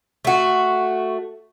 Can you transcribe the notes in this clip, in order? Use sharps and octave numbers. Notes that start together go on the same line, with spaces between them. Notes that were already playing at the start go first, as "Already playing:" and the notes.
A3 F#4